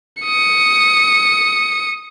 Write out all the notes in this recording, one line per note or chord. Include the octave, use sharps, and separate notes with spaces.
D#6 C#7